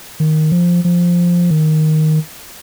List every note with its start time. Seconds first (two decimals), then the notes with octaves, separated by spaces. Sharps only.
0.20 D#3
0.52 F3
0.84 F3
1.50 D#3